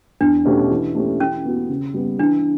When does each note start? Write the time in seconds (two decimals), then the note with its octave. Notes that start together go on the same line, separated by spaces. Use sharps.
0.21 E2 D4
0.45 B2 A3 C#4 G4
0.70 E3
0.95 A3 C#4 G4
1.19 E3 C#4
1.45 B3 F#4
1.69 C#3
1.94 G3 B3
2.19 E3 D4